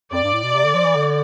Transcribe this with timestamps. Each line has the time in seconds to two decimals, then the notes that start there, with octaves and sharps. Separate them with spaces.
0.13 F2 D5
0.23 G2
0.33 A2
0.44 B2
0.54 C3
0.64 D3
0.75 F3
0.85 E3
0.95 D3